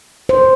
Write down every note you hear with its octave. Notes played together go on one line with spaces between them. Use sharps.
C5